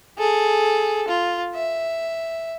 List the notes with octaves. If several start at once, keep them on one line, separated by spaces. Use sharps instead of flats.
G#4 A4
F4
E5